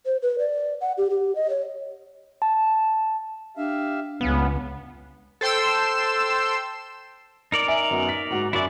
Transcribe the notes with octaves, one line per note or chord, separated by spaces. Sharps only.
C5
B4
D5
F#5
G4
G4
D#5
C#5
A5
D4 G4 E5 F5
C#2 G2 B3 C#4 F5
A4 C5 G5 C6 E6
D#4 A#4 D5
E5 G#5
F#2 B3 F#4
A6 B6
G#2 F#4
F#2 E4 F#4 D5